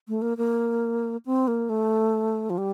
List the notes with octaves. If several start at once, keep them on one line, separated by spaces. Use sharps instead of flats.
A3
A#3
A#3
C4
A#3
A3
F3
G3